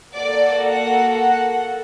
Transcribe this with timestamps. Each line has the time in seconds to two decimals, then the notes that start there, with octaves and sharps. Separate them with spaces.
0.13 A#3 F#4 A4 D5
0.66 F#5
1.18 F#5